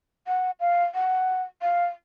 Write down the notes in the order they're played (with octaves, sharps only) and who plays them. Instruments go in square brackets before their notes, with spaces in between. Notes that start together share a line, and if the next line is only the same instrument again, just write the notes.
[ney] F#5
F5
F#5
F5